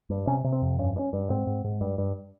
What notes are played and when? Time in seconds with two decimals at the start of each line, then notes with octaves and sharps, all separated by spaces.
0.10 G2
0.27 C3 C#4
0.44 C3
0.52 C4
0.62 F2
0.79 G2 C#4
0.96 G2
0.99 C#4
1.13 G2
1.30 G#2 C4
1.47 G#2
1.64 G#2
1.81 G2
1.98 G2